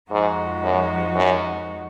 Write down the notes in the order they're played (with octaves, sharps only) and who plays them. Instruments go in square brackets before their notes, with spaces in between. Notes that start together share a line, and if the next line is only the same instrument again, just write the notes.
[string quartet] F2 F3 G#3 D#4 F#4 [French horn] G#2
[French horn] F#2
F#2